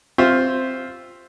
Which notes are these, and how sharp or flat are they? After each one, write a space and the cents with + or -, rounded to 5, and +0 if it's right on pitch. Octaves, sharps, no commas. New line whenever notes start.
C4 +0 F4 +5 E5 +0